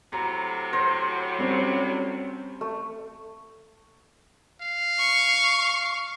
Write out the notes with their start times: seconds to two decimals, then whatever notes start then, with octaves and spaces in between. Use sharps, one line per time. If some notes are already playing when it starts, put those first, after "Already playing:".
0.13 A2 C3 F#3 A#5
0.73 C5 A#6
1.39 G3 C4 C#4
2.61 A3
4.62 F5
5.00 C#6